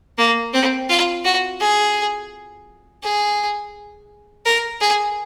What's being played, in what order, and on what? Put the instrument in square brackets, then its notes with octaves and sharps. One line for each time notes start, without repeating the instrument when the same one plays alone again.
[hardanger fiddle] A#3
C4
F4
F#4
G#4
G#4
A#4
G#4